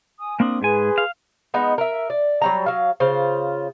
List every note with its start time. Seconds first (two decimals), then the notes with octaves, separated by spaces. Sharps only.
0.19 G#5 D#6
0.40 A#3 C4 D4 D#6
0.62 G#2 G#4 B4 G#5 C6
0.98 F5
1.54 G#3 B3 D#4
1.78 A#4 E5
2.10 D5
2.42 F#3 G3 A#5
2.66 F#3 F5
3.00 C#3 F4 C5